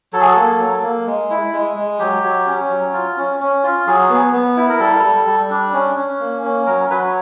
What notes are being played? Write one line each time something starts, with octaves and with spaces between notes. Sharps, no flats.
F#3 A4
G#4
A4
A#3
F#3
A#3
G#3
E4
G#3
G#3
F#3 G4
F#3
C#4
F#3
F4
C#4
C#4
F4
F#3 G#4
B3
B3
E4
A#4
G3 A4
G3
G3
D4
C#4
C#4
A#3
C#4
F#3 A#4
F#3 B4